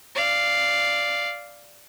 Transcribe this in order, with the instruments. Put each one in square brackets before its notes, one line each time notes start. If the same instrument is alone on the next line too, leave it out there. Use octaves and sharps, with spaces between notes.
[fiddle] D5 F5